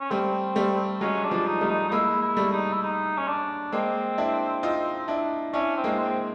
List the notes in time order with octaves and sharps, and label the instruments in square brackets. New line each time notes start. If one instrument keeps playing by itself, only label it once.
[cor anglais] C#4
[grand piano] G3 A3 [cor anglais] C4
[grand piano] G3 A3
[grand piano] F#3 G#3 [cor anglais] C#4
[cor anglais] D4
[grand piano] F3 G3
[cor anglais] D#4
[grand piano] G3 A3
[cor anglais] D#4
D#4
[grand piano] G#3 A#3 [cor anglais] E4
[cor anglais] E4
[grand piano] G3 A3
[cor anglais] D#4
E4
D#4
C#4
D4
[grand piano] G#3 A#3 [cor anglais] C4
[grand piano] D4 E4
D#4 F4
D4 E4
[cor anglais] C#4 [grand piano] D4 E4
[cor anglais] C4
[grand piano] G#3 A#3
[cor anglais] C4